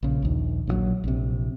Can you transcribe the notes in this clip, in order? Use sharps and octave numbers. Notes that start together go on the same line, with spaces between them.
A#1 C#3
A#1 D#2
A#1 C#3 F#3
A#1 C3